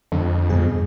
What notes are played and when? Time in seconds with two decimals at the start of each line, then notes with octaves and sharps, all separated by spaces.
0.12 F2 D3
0.50 G2 B2 G#4